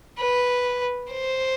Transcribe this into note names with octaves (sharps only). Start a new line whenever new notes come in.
B4
C5